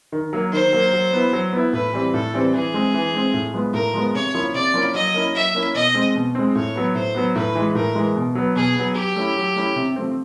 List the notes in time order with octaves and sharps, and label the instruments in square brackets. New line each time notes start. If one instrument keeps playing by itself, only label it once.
[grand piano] D#3
F#3 A#3
[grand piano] D#3 [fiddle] C5
[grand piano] F#3 A#3
F#3
B3 E4
F#3
B3 E4
[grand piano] A2 [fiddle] B4
[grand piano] E3 G3 C4
[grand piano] A2 [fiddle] A4
[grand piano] E3 G3 C4
[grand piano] E3 [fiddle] G#4
[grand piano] G#3 C4
E3
G#3 C4
A2
F3 G#3 B3
[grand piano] A2 [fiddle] A#4
[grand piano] F3 G#3 B3
[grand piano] C3 [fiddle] C#5
[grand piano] F3 A#3 C#4 E4
[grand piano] C3 [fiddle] D5
[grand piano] F3 A#3 C#4 E4
[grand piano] F#3 [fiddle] D#5
[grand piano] A#3 C#4 E4
[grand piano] F#3 [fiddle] E5
[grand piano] A#3 C#4 E4
[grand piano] B2 [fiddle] D#5
[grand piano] G#3 C4
B2
G#3 C4
[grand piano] A2 [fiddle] C#5
[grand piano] F#3 B3
[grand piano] A2 [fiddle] C5
[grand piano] F#3 B3
[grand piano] A2 [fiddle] B4
[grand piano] E3 G#3
[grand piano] A2 [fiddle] A#4
[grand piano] E3 G#3
B2
F#3 B3
[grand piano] B2 [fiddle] G#4
[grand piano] F#3 B3
[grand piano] F#3 [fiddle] G4
[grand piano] A3 C#4 E4
F#3
A3 C#4 E4
C3
F3 A3 C4